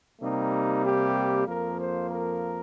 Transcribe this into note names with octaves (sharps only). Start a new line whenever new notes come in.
C3 G3 A#3 D#4
G4
F2 F3 A#3 A#4
C5
A#4